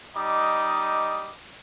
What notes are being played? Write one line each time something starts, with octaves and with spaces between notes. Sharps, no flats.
G3 D#4 D#5 D6 D#6